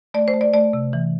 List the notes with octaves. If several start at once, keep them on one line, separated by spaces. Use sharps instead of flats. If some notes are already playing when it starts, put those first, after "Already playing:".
A3 D5
C5
A3
D5
A3 D5
C3
E3